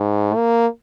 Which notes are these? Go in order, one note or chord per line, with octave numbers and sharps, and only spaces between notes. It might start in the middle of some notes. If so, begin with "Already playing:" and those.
Already playing: G#2
A#3